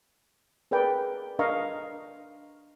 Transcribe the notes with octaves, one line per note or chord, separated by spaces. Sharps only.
G#4 A#4 B4 D5 G5
D4 A#4 D#5 F5 A#5 C#6